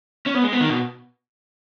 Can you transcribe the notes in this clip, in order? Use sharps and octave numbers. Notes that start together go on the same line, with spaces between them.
C#4
B3
G#3
B3
D#3
B2